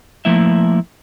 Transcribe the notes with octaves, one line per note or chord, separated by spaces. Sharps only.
F3 A3 A#3 E4 E5